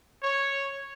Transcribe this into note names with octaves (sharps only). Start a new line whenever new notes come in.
C#5